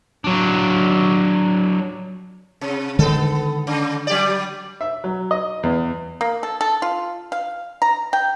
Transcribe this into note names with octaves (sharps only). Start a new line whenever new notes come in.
F#3 D4
C3
D3 D#3 G#3 B3 A4
C#3
F#3 G4 D5
E5
F#3
D#5
E2
A#3
A4
A4
F4
F5
A#5
G5